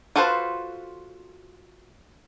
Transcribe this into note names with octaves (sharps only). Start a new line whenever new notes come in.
F4 F#4 A4 B4 C5